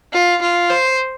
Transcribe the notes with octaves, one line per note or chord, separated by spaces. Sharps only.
F4
F4
C5